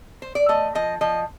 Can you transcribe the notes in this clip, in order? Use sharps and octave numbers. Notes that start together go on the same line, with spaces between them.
C5
D5
A3 D#5
F3 D#5
F3 D#5